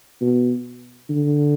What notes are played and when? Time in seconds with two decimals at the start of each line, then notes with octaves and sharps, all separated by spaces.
0.21 B2
1.10 D3